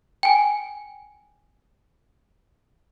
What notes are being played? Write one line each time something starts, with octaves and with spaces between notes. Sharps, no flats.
G5 G#5